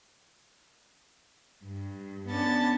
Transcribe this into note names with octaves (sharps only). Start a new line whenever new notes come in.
G2
B3 C#4 D4 A5 A6